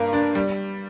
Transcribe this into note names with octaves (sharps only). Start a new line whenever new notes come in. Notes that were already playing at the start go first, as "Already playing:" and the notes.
Already playing: G2 A#3 A#5
D4
G3